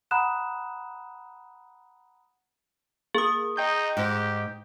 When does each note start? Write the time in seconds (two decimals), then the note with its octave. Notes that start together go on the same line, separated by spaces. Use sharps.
0.11 F#5 A#5 B5 D#6 F#6 E7
3.15 A#3 G#4 D#6
3.57 D#4 D#5 G5 G6
3.97 G#2 G4